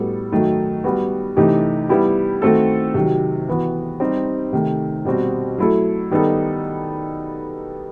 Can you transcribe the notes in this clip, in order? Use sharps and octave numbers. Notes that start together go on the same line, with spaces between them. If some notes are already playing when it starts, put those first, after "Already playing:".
Already playing: A2 G3 B3 F#4 A4
D#3 F#3 A3 D#4
G3 B3 F#4
C3 E3 A3 D#4 G4
G3 B3 E4 G4
D#3 A3 C4 F#4 A4
C3 D#3 F#3
E3 B3 F#4
G3 C4 D#4 G4
C3 D#3 A3
B2 G3 C4 F#4
F#3 A3 E4 A4
D#3 G3 B3 D#4 A4